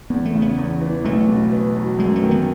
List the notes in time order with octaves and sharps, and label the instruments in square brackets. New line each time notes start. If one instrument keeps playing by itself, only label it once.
[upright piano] E2 [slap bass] B3
[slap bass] A3
[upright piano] C#3
[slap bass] B3
[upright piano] E2
E3
[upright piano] B1 [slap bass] A3
[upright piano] B2
B3
F#3
[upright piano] F#2 [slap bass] G#3
[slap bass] A3
[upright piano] D#3
[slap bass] B3